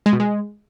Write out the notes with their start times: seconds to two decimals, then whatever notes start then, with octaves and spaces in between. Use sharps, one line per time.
0.06 G#3
0.13 B2
0.20 G#3